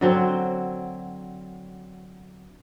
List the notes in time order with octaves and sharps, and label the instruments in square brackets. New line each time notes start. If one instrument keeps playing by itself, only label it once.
[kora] D3 F#3 C4